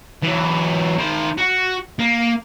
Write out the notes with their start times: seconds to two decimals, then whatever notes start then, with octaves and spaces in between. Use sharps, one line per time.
0.23 E3 F#3
0.98 D#3 C5
1.38 F#4
1.99 A#3